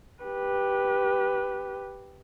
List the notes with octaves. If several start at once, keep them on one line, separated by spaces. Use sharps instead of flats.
G4 B4